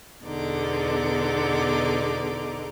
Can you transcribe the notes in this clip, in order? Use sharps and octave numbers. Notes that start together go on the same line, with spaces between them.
E2 B2 D3 D#4 D6